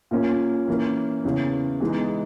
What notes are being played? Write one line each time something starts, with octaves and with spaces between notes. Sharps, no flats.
A#2 A#3 C#4
E3 A#3 C#4
E2 C#3 E3
E3 G#3 B3 D#4